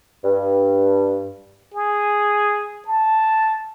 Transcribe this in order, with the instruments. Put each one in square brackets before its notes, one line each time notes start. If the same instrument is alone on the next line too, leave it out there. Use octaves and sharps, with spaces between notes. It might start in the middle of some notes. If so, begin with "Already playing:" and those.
[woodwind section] G2
[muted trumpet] G#4
A5